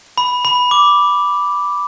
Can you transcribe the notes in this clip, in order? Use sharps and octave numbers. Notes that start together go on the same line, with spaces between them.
B5
B5
D6